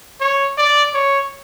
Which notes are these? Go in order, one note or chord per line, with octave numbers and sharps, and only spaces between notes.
C#5
D5
C#5